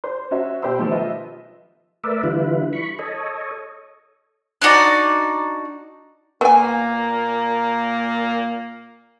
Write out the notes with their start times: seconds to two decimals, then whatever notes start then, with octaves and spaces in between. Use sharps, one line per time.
0.04 C5 C6
0.31 C#4 F#4 E5
0.62 B2 G4 C5 B5 C6 E6
0.79 D#3 F3 A3
0.92 F4 B4 D#5 E5
2.04 A3 A#4 B4 D5 E5
2.23 D3 E3 G3 E4 F4 B4
2.73 B5 C#6
2.99 A4 C#5 D#5
4.62 D4 D#4 F#4 D5
6.41 A#2 A#3 B3 G#5